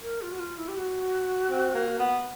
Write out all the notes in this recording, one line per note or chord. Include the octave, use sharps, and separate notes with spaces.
A#4
F4
F#4
F4
E4
G4
F#4
C4
A#3
B3